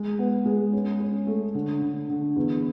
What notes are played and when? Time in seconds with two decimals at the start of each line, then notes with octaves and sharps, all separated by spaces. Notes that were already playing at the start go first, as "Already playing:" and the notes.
Already playing: G#3
0.19 B3
0.46 G#3
0.73 C#4
1.00 C#4
1.27 A3
1.55 D3
1.81 D3
2.09 D3
2.36 E2